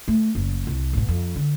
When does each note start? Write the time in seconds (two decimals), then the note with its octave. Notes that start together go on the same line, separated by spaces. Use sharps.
0.08 A3
0.35 F#1
0.67 C2
0.93 G#2 B2
1.08 F2
1.36 D3